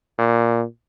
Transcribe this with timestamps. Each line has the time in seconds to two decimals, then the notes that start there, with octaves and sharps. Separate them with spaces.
0.18 A#2